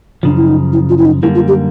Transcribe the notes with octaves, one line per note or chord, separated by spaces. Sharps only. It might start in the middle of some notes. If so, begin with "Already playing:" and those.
F#2 C#3 F3 D4
E4
D#4
E4
F4
E4
D#4
F#2 D3 G3 A#3 E4
F4
G4